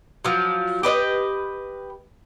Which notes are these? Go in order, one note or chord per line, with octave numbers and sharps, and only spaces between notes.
F3 F#3
G4 B4 D5 D#5